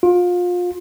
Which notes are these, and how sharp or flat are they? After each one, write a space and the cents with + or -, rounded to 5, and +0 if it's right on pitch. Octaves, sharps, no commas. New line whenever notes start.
F4 +30